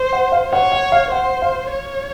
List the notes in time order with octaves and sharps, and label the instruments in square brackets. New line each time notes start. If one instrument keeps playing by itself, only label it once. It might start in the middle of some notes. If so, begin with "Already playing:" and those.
Already playing: [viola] C5
[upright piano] F#5
F5
[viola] C#5 [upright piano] F#5
[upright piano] F#5
F5
[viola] C5 [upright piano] F#5
[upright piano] F5
[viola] C#5